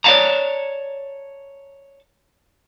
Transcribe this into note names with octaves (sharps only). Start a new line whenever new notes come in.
C#5 D5 E5 F#5 A5 A#5